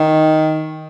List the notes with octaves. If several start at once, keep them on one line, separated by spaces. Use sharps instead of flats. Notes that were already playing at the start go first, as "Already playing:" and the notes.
Already playing: D#3